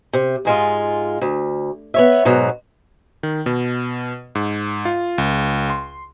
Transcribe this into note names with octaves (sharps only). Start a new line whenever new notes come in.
C3
G#2 G#3 F4
D2
B3 C#5 E5
G#2 B2 F#3
D#3
B2
G#2
F4
C#2
C6